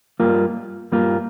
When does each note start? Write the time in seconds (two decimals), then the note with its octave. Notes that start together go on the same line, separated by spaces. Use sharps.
0.20 G2 G3 A#3 F4 A#4
0.92 G2 G3 A#3 F4 A#4